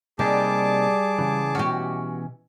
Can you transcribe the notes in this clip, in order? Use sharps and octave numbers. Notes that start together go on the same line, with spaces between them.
C3 G3 A#3 D#4 G#4 A5 D6
C#3 E3
B2 E3 C#4 F#4 G4